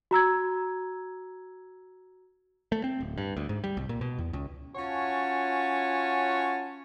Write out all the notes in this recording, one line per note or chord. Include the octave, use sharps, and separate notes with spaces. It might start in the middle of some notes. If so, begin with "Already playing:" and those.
F#4 A#5 E6 G#6
A3
C4
D1
G2
D2
G#2
G3
C2
A#2
B2
E2
C#2
C#4 F4 F#4 C#5 G#5 A5